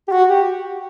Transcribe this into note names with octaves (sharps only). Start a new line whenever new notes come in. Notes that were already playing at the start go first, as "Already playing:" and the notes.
G4
F#4
G4